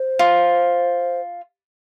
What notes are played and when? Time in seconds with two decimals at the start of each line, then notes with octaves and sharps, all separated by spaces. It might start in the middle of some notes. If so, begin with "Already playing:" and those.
Already playing: C5
0.19 F4